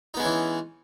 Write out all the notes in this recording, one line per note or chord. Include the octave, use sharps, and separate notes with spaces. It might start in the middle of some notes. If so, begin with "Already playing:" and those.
E3 G#3 B3 C#4 D#4